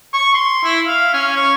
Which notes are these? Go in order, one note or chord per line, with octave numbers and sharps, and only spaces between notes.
C#6
C6
E4
F5
C#4
C#5